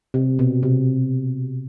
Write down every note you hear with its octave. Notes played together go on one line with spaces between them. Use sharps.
C3
B2
C3